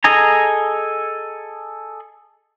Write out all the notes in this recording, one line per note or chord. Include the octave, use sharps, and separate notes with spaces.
G#4 A4 D#5 G#5 A#5